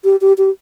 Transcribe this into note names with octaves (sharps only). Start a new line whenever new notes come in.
G4
G4
G4